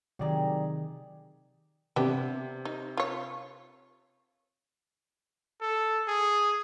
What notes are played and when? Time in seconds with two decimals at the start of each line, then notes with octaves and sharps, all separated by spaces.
0.19 C3 D#3 F#3 G4 G#4 D5 A#5
1.96 C3 B3 D4 G4
2.65 D#4
2.97 F4 C#5
5.61 A4
6.08 G#4